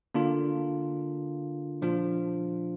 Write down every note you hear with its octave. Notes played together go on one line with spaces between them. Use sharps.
D3 A#3 D4 F4
A#2 F3 D4 F4